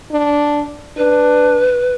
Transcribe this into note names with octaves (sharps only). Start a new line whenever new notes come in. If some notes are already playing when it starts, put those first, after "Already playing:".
D4
D4 B4